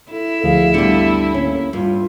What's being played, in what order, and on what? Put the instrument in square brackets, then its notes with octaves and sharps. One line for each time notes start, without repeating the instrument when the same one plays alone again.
[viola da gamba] E4 [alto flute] A4
[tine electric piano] D2 F3 G#4 [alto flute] F5
[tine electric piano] G1 D2 C#7 [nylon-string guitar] D3 G3 [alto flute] B3
[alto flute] A#3 [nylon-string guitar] C#4
[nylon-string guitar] G2 [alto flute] F4